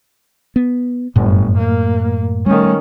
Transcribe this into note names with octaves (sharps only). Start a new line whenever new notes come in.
B3
G1 F#2 A2
A#3
D#3 G3 A3 C#4